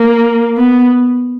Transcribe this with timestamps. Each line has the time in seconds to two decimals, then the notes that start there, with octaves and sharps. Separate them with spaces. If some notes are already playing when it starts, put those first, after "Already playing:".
Already playing: A#3
0.57 B3